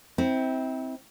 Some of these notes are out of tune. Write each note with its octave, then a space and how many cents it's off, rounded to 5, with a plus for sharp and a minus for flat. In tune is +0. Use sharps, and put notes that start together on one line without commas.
C4 +0 E4 -35